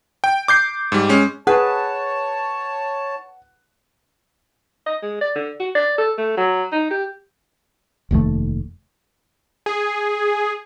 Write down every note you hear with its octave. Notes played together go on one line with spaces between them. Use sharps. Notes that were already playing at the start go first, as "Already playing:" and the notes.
G5
D6 G6 C7
G#2 G3
G#3 C#4
G#4 B4 C#5 F#5 A5
D#5
G#3
D5
D3
F#4
D5
A4
A3
F#3
D#4
G4
F1 D#2 A#2 A3
G#4